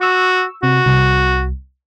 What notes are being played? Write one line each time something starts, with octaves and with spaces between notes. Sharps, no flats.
F#4 C#6 E6
C3 F#4
C2